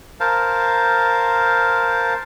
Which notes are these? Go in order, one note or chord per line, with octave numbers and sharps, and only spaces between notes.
A#4 C5 F5 A5